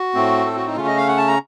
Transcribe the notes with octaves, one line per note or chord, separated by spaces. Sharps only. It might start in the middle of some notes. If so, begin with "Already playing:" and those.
Already playing: F#4
A2 A3 C4
A4
F#4
D#4
C#3 A3 C#4 F4
D#5
F5
F#5
A5
A#5